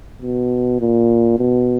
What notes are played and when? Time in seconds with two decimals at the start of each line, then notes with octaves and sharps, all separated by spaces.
0.22 B2
0.80 A#2
1.39 B2